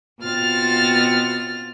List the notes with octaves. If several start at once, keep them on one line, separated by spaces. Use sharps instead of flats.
B2 C4 F4 F6 A6